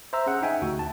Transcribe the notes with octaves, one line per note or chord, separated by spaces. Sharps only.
C5 E5 A#5 E6
C#4 G#4 F#5
D#4 E5 G5 G#5
D2 F#4
A5